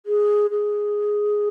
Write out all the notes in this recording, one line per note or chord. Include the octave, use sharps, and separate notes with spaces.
G#4
G#4